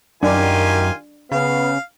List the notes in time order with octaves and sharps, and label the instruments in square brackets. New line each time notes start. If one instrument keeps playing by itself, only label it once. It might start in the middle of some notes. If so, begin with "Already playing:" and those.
[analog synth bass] F#2 [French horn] D#3 [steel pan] D4 [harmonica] F4 G4 G#5
[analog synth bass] C#3 [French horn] B3 [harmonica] F5